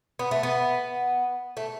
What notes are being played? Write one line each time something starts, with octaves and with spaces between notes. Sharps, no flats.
B3
A3
B3
A3